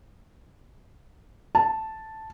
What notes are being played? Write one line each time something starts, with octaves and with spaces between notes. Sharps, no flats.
A5